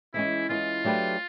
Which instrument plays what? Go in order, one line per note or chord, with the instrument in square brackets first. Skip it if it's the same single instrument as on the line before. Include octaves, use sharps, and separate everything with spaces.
[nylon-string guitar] E3 G#3 C#4 [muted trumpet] E4
[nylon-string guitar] E3 G#3 C#4 [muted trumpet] F4
[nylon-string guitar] F#3 A3 D4 G4 B4